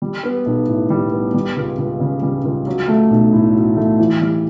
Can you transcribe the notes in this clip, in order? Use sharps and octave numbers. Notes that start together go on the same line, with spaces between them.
G3
B3
B1
A2
G3
B3
G3
C#2
C#2
C#3
G3
C#2
F#3
A3
B1
A2
F#3
A3
E3
G3